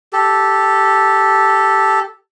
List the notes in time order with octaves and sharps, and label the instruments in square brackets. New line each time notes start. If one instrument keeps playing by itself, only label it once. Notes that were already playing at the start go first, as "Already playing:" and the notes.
[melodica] G4 A4